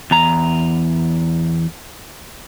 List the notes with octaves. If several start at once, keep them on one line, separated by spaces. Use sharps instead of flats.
E2 A#5